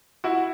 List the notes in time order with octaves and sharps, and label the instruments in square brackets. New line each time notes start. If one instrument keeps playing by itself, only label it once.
[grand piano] E4 F#4